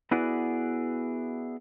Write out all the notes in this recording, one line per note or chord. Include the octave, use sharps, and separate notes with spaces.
B3 E4 F#4 G#4 B4 D5